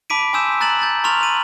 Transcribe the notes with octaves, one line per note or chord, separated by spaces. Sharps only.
A5 B5 D6 B6 D7 D#7
G#5 C6 D#6 E6 G6 E7
A#5 F#6 A6 E7 F#7
G6 A6
A#5 C6 C#6 F6 A6 F7
B5 D#7 F#7